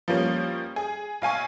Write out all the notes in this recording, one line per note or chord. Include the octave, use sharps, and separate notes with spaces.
F3 G3 A#3 C#4
G#4
B1 F5 G#5 C#6